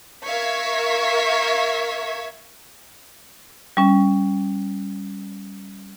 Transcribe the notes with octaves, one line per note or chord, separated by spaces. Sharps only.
A#4 E5 F5 C#6 G#6 B6
G3 C#4